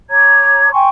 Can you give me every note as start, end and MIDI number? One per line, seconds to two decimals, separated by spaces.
0.10 0.68 73
0.10 0.68 82
0.10 0.68 86
0.10 0.68 92
0.72 0.88 79
0.72 0.88 80
0.72 0.88 84
0.72 0.88 85